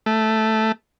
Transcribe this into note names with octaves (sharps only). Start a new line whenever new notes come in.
A3